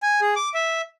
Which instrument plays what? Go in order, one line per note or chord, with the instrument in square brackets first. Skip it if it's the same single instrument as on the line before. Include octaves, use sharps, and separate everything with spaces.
[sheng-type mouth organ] G#5
G#4
D6
E5